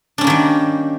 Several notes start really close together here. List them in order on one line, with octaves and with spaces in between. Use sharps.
D4 C#4 A#3 D#3 G3